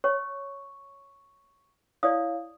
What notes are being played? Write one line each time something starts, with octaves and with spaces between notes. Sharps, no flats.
C#5 C#6
E4 C#5 D5 F5 D#6